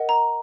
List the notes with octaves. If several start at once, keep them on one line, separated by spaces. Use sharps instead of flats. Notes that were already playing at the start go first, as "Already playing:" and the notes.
Already playing: A#4 D#5 F#5
A#5